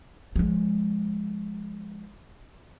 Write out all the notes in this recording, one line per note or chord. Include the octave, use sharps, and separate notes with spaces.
F3 G#3